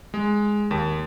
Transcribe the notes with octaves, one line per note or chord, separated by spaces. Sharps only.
G#3
D#2